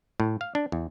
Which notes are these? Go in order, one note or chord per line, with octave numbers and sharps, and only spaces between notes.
A2
F5
D4
E2